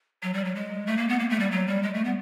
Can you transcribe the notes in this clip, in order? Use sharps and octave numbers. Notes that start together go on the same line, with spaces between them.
F#3
G3
F#3
G#3
A3
A#3
B3
A#3
A3
G3
F#3
G3
G#3
A3
B3